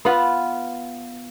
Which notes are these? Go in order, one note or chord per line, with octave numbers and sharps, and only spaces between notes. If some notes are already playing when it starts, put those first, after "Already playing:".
B3 F4 B4 F#5